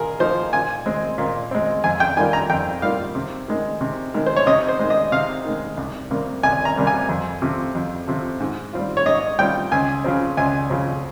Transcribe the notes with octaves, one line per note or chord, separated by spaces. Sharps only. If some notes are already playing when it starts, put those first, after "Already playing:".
Already playing: A#2 G#4 A#4
F3 A#3 D#4 C5
A#2 G#5
G#3 C4
A#2
G#3 C4
F2 G#5
G5
D#3 G3 A#3 F4 G#5
A#5
F2 G5
D#3 G3 A#3 F4 F5
C3
D#3 G#3
C3
D#3 G#3
C5
C#5
C3 D#5
C5
D#3 G#3
D#5
C3 F5
D#3 G#3
C2
C3 G3 A#3
C2 G#5
A#5
C3 G3 A#3
G#5
F2
C3 F3
F2
C3 F3
G#2
G3 C4 F4
C#5
G#2 D#5
G3 C4 F4 G5
C#2 G#5
C#3 F3 C4
C#2 G#5
C#3 F3 C4